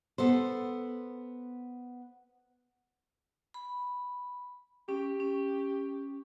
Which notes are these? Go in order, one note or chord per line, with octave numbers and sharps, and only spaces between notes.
B3 A4 C5
B5
C#4 G4
C#4